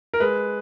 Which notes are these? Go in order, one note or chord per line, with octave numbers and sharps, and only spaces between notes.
A#4
G#3 B4